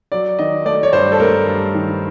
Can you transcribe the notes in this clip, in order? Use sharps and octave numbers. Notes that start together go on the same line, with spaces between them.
F#3 D5
D#3 D#5
A3 D5
C#5
G2 C5
A4
A3 A#4
G2
D#3